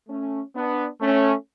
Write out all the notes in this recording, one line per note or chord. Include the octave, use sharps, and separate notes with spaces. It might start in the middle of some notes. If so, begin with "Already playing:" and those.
A3 C#4
B3 D4
A3 C#4